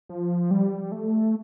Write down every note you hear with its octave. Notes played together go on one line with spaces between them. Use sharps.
F3
G3
A3